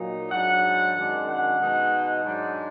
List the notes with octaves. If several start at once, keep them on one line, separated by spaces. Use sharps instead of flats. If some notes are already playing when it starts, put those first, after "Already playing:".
Already playing: A#2 F#3 A#3 D#4
G#2 F#3 D4 F#5
F#2 D#3 G#3 D4
F#5
B2 G#3 D#4
G#2 F#3 D4